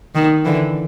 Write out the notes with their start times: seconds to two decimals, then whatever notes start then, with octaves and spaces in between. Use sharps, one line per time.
0.15 D#3
0.45 D3 E3